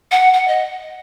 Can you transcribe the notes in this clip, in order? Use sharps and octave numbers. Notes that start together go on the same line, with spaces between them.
F#5
F#5
D#5